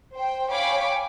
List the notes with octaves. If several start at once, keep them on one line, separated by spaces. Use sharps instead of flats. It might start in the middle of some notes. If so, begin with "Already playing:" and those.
C5 G5
C#5 F5 G5 G#5 B5 D6